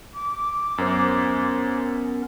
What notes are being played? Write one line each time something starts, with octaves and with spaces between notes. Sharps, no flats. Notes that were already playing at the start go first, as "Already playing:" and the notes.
D6
F#2 B3 C#4 A#4 C5